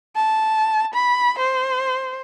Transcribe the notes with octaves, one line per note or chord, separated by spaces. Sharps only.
A5
B5
C5